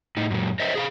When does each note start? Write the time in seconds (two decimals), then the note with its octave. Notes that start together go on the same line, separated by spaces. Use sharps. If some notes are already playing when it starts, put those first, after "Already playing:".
0.17 A2 D#4
0.30 F#2 A#2 F#3
0.60 A#4 C5 D#5 E5
0.75 G#4 E5 F5